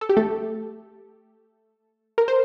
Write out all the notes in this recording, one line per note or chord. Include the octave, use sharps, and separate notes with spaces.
A4
G4
A3 A4
A#4
C5